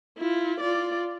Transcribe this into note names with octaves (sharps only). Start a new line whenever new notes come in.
E4 F4
F4 D5